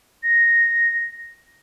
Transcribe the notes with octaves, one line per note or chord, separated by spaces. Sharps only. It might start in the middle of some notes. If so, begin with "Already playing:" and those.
A#6